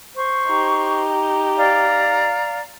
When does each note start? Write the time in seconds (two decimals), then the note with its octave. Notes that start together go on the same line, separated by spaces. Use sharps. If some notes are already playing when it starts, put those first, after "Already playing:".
0.16 C5 C#6
0.47 D#4 G4
1.57 D5 F5 A#5